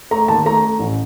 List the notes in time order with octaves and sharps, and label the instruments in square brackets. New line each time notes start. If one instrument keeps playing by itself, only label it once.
[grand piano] A3 A#5
D#2 A5
A3 A#5
A3
A1